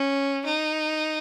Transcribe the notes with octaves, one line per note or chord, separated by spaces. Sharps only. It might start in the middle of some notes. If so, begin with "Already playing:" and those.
Already playing: C#4
D#4